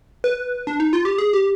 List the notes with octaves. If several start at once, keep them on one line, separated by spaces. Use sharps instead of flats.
B4
D4
D#4
F4
G4
G#4
G4